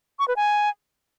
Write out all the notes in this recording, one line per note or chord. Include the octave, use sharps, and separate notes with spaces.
C#6
B4
G#5